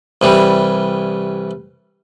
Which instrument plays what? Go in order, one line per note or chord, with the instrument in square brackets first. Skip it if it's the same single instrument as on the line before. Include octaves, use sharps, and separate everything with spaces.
[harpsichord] C2 E3 G3